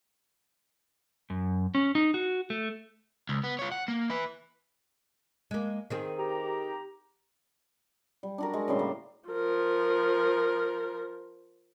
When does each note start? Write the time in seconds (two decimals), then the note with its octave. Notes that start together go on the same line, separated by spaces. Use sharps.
1.30 F#2
1.75 C#4
1.95 D#4
2.14 F#4
2.50 A3
3.29 C#2
3.44 B3
3.59 F4 C#5
3.72 F#5
3.88 A#3
4.10 E4 B4
5.51 G#3 A#3
5.90 D#3 C4 G#4
6.18 G4 A#5
8.23 G3
8.38 D4 F#4 A#4
8.53 G#3
8.68 A2 C#3 G3 C6
8.79 A#3
9.29 F3 A#4